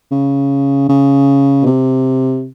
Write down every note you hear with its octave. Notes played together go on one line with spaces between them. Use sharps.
C#3
C#3
B2
C3